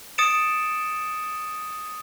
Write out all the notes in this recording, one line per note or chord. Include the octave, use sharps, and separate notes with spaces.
D#6 A6 C#7 D7 E7